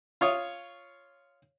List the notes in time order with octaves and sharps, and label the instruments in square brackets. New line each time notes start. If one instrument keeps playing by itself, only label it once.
[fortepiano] F4 C#5 D#6